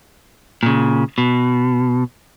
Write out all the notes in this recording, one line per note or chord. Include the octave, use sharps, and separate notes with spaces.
A#2 C#3
B2